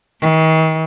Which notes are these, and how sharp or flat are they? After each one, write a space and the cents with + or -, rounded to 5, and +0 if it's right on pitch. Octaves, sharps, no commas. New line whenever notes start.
D#3 +45